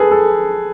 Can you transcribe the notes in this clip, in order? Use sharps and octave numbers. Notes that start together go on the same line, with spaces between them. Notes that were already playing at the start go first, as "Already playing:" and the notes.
Already playing: G#4 A4 B4
A4